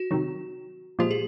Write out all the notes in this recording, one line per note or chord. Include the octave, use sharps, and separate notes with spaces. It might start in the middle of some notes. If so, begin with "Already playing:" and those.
Already playing: F#4
C3 D#3 F#3
A#2 F3 G#3 G4
G#4